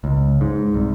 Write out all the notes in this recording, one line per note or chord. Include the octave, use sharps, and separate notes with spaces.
C#2
G#2
C2